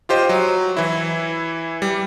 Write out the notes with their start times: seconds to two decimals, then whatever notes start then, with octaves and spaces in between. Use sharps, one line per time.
0.09 F4 G4 C5 D#5
0.29 F#3
0.77 E3 E4
1.82 G3